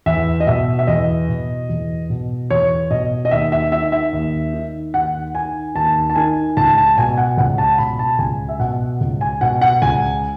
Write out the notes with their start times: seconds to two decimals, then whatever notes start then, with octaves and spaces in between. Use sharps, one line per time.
0.06 E2 E5
0.40 D#5
0.47 B2 E5
0.79 E5
0.87 E2 D#5
1.29 B2
1.69 E2
2.10 B2
2.50 E2 C#5
2.90 B2 D#5
3.25 D#5
3.31 D#2 E5
3.52 E5
3.72 D#3 E5
3.92 E5
4.13 D#2
4.53 D#3
4.94 D#2 F#5
5.34 D#3 G#5
5.75 D#2 A5
6.10 A5
6.16 D#3 G#5
6.57 C#2 A5
6.78 A5
6.97 B2 G#5
7.18 F#5
7.38 C#2 F#5
7.58 A5
7.78 B2 B5
7.99 A5
8.19 C#2 G#5
8.49 E5
8.59 B2 F#5
9.01 C#2
9.21 G#5
9.41 B2 F#5
9.62 F#5
9.82 C#2 G#5